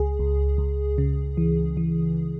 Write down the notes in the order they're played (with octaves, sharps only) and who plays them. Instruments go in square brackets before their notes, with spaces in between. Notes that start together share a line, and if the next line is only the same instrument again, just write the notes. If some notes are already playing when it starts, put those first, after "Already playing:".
Already playing: [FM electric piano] C#2 G#4
C#2
C#2
C#3
E3
E3